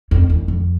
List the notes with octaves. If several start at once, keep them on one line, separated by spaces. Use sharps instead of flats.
F2
E2
F2